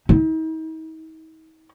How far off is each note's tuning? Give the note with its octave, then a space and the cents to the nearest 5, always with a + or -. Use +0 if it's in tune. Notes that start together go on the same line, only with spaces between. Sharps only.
D#4 +45